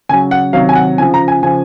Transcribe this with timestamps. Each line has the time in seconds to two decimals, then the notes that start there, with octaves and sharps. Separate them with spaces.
0.09 C#3 F#3 G#5
0.31 F#5
0.53 C3 D#3 F#3 F5
0.69 G#5
0.75 F#5
0.98 C#3 F3 G#5
1.14 A#5
1.28 G#5
1.43 C#3 F3 G#5